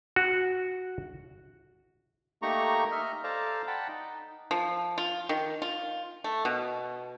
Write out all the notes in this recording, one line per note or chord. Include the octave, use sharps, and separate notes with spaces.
F#4
A3 A#3 D#4 G4 A#5 C#6
D#5 E5 F6
A4 C5 D5 F5 A5 A#5
F#5 G5 A5 B5
D#4
F3
F4
D#3
F4
A3
B2